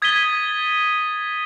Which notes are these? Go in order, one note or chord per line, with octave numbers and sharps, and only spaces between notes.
D#6 G#6 A6 B6 D#7 G7